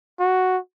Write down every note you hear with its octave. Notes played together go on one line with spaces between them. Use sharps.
F#4